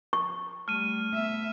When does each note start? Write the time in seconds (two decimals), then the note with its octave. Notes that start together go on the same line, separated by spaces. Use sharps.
0.13 C#6
0.68 G3 A3 F6 D#7
1.13 B3 E5